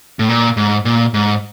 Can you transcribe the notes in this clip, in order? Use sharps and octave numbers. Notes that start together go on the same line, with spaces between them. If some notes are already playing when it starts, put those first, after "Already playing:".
A2
A#2
G#2
A#2
G#2